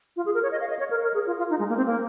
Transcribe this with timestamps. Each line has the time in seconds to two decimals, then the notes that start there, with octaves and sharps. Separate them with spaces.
0.16 F4
0.26 G#4
0.34 A#4
0.43 C#5
0.52 D#5
0.61 F5
0.70 D#5
0.79 C#5
0.91 A#4
1.03 A#4
1.14 G#4
1.27 F4
1.38 F4
1.50 D#4
1.59 G#3
1.69 A#3
1.77 C4
1.86 A#3